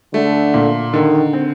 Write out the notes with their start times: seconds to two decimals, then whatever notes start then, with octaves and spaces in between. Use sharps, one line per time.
0.14 D3 A3
0.54 A#2
0.94 D3 D#3
1.33 C4